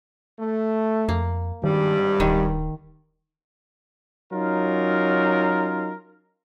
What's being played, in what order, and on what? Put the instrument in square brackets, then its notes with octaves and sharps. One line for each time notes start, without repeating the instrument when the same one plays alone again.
[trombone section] A3
[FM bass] F2 [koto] A#3
[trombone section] G#1 G2 [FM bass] D#3 [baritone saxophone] G3
[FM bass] D1 [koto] D#3
[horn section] F#3 C#4 D#4 F4 A#4